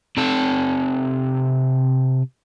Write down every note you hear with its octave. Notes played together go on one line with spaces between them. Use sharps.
C3 A4